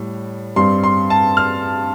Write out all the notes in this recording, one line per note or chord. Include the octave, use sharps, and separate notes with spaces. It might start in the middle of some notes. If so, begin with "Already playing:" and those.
Already playing: A2 G3
G2 G3 C4 C6
C6
A5
F6